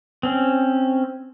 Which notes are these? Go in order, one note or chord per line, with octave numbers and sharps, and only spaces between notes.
C4 C#4